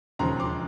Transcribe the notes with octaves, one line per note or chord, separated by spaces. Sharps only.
E1 D#2 C#3 F3 A#5 C6
C6 D6